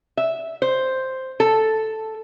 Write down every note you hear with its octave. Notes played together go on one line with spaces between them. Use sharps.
E5
C5
A4